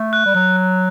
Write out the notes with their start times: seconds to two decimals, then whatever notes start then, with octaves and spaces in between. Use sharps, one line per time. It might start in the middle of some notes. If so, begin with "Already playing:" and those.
Already playing: A3
0.13 F#6
0.26 G3
0.35 F#3 F#6
0.57 F#6